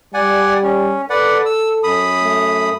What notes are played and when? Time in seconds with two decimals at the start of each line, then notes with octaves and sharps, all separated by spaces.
0.14 G3 D5 F#5 G#5
0.62 C#4
1.10 A4 B4 D5 F#5
1.46 E6
1.83 F#2 B5 D#6
2.23 A3